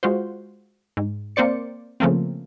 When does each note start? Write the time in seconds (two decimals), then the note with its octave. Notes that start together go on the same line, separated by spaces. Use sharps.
0.03 G#3 F4 F#4 C5
0.97 G#2
1.36 A#3 C4 C5 D5 C#7
2.00 C#3 F3 A3 A#3 C4